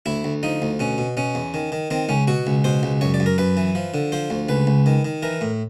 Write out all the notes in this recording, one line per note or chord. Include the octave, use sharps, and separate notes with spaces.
D2 E4
D2
F3 D#4
D2
B2 C#4
B2
B2 C#4
E2
D#3
D#3
D#3 C4
C#2 C#4
B2 F#4
C#2
B2 C5
C#2
F#2 C#5
D5
F#2
A#4
F#2 B4
E3
F3
D3
F3 C5
D2
C#2 B4
C#2
D#3
D#3
E3 A#4
A2